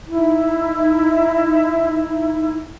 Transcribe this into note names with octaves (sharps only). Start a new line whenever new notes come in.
D#4 E4